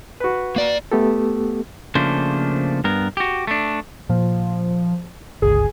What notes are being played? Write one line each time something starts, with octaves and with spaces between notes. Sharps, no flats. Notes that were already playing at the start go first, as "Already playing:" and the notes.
F#4 B4
A#3 D5
A3 B3 G4 A4
C#3 F3 A3 A#3 D4 C5
G2 B3 A#4
F#4 G4
A3 D4
A#2 F3
G1 C#2 G#4